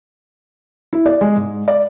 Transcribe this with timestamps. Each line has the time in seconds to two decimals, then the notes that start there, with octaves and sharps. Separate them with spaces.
0.93 E4
1.06 D5
1.21 G#3
1.36 G#2
1.68 D5